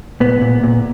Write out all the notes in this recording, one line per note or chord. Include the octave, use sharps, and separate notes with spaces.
A#2 B3
A#2
A#2